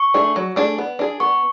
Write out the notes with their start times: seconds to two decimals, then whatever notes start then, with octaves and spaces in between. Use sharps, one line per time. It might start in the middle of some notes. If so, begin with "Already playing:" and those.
Already playing: C#6
0.14 A3 D4 G#4
0.36 F#3
0.56 A3 D4 G#4
0.78 B3
0.99 D4 G#4
1.20 B3 C#6